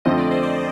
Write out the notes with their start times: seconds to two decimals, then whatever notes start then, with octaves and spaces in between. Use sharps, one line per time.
0.05 F2 D3 F3 A3 C4 D#5
0.18 D5
0.31 C5
0.43 D5